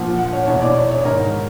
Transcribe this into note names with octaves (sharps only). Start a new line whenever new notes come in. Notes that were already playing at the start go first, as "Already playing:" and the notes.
Already playing: A#2 F3 F#5
F#5
C#5
E2 B2 C#5
D5
C#5
C#5
G#2 D#3 A#4